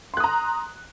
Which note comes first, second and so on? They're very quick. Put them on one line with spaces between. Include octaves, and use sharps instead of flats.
C6 F#6 D#6 A#5